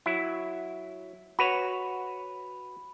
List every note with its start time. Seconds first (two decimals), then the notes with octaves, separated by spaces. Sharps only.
0.06 F#3 E4
1.39 F#4 B4 C#5 B5